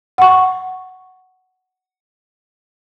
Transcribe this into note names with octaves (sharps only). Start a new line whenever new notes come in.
F#5 C#6